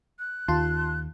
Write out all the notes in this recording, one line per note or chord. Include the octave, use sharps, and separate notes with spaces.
F#6
D#2 F4 A5 C6